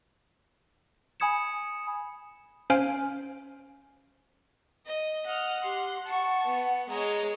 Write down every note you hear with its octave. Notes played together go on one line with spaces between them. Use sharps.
G#5 B5 D#6 G#6 C#7 E7
C#4 C5 F5 G#5 F6 D7
D#5
D#5 F#5 F6
G4 C6
F#5 A5 C#6
B3
G#3 C#5 D#5 A#5